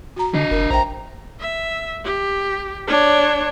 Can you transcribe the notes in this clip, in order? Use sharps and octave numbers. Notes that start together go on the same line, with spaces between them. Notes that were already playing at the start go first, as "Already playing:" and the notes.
F#4 A#5
D3 D4 D#5
F#1 A#4
A#1 C5 E5 G5 A#5
E5
G4
D4 C#5